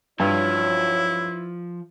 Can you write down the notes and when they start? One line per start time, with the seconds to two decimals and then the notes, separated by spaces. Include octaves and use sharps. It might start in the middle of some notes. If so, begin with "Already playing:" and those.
0.20 G2 F3 F#3 C#4 E4 C#5